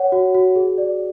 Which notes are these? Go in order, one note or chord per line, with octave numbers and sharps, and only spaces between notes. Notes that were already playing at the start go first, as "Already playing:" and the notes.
Already playing: C#5 F#5
F#4
F#4
G#4
D5